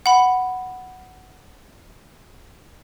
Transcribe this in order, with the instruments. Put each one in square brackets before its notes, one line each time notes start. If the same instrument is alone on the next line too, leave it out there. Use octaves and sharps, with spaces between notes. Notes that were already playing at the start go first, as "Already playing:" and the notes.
[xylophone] F#5 B5